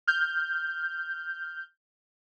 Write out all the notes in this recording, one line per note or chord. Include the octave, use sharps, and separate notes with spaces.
F6 G6